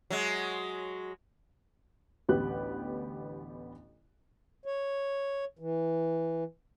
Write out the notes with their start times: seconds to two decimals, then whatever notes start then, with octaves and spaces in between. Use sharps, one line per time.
0.10 F#3 G#3
2.29 A1 D2 B3 G4 F#6
4.66 C#5
5.59 E3